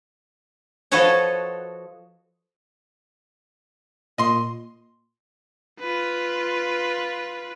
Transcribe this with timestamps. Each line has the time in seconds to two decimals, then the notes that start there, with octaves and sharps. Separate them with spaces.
0.92 F3 F#4 A4 B4 C#5 D#5
4.18 A#2 D#5 C6
5.79 F4 B4